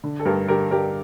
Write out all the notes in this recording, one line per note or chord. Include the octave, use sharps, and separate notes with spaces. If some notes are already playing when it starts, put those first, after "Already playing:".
D3
A4
G2 G4 A#4
D3 G4 A#4
G2 G4 A#4